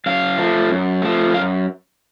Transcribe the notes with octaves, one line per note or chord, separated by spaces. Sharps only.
F#2 F5
F3 A3
F#2
F3 A3
F#2 F5